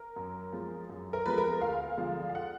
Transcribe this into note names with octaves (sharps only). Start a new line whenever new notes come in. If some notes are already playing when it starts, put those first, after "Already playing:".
Already playing: A#4
F#2
F3 G#3
F#2
A#4
F3 G#3 B4
A#4
D2 F5
D3 F3 G#3
F5
F#5